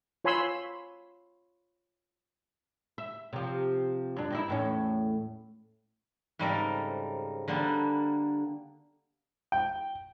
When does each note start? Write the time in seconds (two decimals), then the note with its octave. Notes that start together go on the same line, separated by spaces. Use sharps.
0.24 F4 C#5 G#5 B5 C6 E6
2.98 E5
3.33 C3 F3
4.17 F#2 D4
4.30 G2 D#4 E4
4.48 E2 A2 C#4
6.39 G#2 C#3 G3 C4 A4 A#4
7.48 D3 G3 A#3 B3 A4
9.52 G5